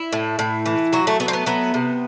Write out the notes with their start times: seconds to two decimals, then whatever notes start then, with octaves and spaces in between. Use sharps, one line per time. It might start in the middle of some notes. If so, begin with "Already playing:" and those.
Already playing: E4
0.13 A2
0.39 A2
0.66 E3
0.93 F#3 F#4
1.07 A3
1.20 A3 B3
1.28 C4
1.33 B3
1.46 F#3 B3
1.74 C3